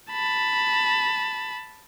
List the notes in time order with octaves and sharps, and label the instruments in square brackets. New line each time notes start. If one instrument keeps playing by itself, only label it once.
[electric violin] A5 B5